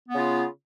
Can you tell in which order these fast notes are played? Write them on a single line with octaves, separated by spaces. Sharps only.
B3 C#3 F4